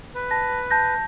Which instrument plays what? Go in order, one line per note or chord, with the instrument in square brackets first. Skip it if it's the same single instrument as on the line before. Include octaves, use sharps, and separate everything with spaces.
[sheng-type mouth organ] B4
[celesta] A5 A#6
A5 G6 A#6